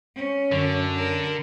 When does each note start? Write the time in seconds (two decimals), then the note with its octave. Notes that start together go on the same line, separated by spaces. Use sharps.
0.16 C#4
0.52 F#2 D3
0.97 A#4